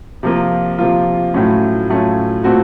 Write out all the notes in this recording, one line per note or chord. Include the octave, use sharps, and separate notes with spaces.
C3 F3 A#3 F4
C3 F3 A#3 F4
A2 F#3 A3 C#4 F4
A2 F#3 A3 C#4 F4
A#2 A3 C4 F#4